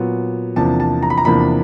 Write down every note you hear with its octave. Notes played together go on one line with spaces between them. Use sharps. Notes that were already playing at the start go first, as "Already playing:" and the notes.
Already playing: A#2 F#3 B3
E2 C3 F3 A#3 D4 A5
A5
A#5
B5
A#5
E2 C3 F3 A#3 D4 B5